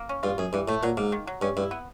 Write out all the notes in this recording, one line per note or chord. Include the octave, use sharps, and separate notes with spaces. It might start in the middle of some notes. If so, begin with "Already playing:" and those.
Already playing: A#3
C#4
G2 F4
F#2 G#4
G2 E3
A2 A3
A#2 F#3
G#2 A#3
D#3
F#3
G2 C#4
G2 E4
B3